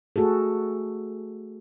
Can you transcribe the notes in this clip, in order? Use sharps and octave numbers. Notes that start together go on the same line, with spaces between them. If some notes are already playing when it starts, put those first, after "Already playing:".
A3 F#4 G#4 A4